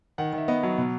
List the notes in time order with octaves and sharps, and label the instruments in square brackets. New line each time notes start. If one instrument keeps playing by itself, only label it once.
[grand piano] D#3 F#5
D#3
E5
B3 D#5
F#3
B2